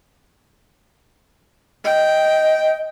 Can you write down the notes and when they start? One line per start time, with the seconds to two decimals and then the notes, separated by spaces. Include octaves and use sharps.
1.85 D#5 G5